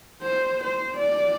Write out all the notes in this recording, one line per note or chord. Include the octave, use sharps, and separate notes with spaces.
C5
C5
D5